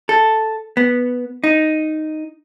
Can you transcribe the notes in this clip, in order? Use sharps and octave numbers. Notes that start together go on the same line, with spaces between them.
A4
B3
D#4